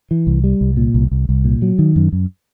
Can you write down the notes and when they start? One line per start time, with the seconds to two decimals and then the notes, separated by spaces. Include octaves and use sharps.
0.11 E3
0.27 C2
0.44 G3
0.61 C2
0.77 A#2
0.94 C2
1.11 C2
1.29 C2
1.45 A#2
1.62 F#3
1.79 D#3
1.96 F#2
2.12 F#2